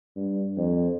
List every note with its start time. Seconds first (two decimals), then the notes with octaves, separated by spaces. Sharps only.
0.16 G2
0.57 F2